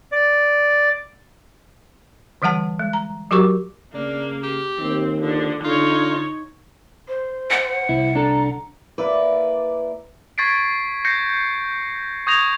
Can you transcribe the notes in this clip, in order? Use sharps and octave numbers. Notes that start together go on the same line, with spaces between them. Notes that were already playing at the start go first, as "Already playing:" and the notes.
D5
D3 E3 G3 F#5 A5
G#3
A#5
F#3 F#4 G4 A#4 C#6 D6
C#3 A#3 D4
G4
D#2 C4
D3 F3
D3 D#4 F4 C#5
C5
F#5
C2 E4
D4 A4 A#5
A#3 E4 B4 D5
C#6 G#6 A6 B6 C7 D7
G6 A#6 C7 C#7
C#6 D#6 G6 G#6 A#6 F7